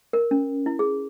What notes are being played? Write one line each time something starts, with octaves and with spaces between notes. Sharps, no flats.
A#4
C#4
E4
G#4